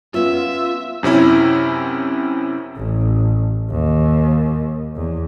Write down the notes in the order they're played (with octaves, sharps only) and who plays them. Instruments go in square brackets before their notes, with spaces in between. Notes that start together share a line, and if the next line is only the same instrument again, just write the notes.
[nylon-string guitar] B3 C#4 [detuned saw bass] F4 [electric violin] E5
[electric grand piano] F#2 C3 C#4 E4
[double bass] A1
D#2
E2